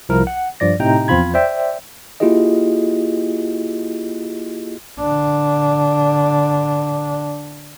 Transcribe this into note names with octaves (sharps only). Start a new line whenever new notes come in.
C2 F3 E4 A#4
F#5
G2 F3 D5 A#6
A2 C3 D#4 G5 A#5
E2 F3 C4 F4 B5 G#6
C5 D5 E5 G5
A#3 E4 F4 G4 G#4 D#5
D3 D4